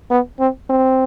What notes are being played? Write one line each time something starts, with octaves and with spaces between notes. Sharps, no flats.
B3
C4
C4